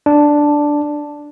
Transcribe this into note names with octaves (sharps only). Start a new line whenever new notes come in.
D4